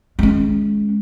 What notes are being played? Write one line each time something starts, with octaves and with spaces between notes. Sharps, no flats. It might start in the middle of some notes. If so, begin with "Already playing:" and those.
G#3 C#4